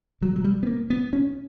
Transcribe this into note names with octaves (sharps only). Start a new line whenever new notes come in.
B2 F#3
F#3
G3
B3
A#3
B3
C#4